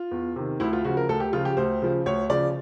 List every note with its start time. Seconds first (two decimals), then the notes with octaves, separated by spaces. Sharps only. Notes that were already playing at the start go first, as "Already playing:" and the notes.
Already playing: F4
0.11 E2
0.36 C3 D#3
0.60 D2 E4
0.73 F4
0.85 C#3 F3 F#4
0.97 A#4
1.09 D2 A4
1.20 G4
1.33 C#3 F3 F4
1.45 G4
1.57 D2 C5
1.82 C#3 F3
2.06 D2 C#5
2.30 C#3 F3 D5